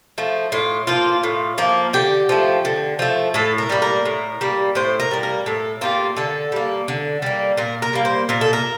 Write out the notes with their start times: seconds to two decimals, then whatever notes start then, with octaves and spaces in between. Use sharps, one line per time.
0.18 F3 A3
0.52 A2 F4
0.87 F3 A#3 F4
1.23 A2
1.58 F3 A#3
1.93 D3 G4
2.29 F3 A3
2.65 D3
2.99 F3 A3
3.34 A2 A4
3.58 A#4
3.69 G3 A#3
3.82 A#4
4.05 A2
4.41 G3 A#3
4.75 A2 C5
5.00 A#4
5.11 G3 A#3
5.23 A#4
5.46 A2 A4
5.81 G3 A#3 F4
6.16 D3 A4
6.52 G3 A#3
6.88 D3
7.22 G3 A#3
7.57 A#2 A#4
7.82 A#4
7.93 G3 A#3
8.05 C5
8.29 A#2 A#4
8.41 A4
8.53 A#4